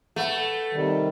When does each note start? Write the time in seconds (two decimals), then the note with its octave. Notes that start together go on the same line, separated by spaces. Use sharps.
0.16 A3 A4 B4 F#5
0.73 C3 D#3 G3